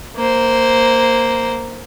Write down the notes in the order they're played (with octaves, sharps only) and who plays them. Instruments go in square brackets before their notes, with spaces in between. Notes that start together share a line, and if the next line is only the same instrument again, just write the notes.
[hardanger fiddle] A#3 C5